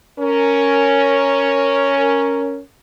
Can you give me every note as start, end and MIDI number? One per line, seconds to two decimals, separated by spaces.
0.19 2.59 61
0.19 2.59 70